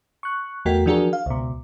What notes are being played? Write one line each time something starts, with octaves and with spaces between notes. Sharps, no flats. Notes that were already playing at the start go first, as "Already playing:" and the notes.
C#6 F#6
E2 A3 F#4 A#4 G5 B6
E3 F3 D4 F#4 G#4 A#4
F5
C#2 B2